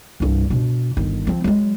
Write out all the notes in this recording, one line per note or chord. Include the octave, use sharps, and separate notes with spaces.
C2 G2
B2 D4
G1 D#3
F3 C4
F#3 G#3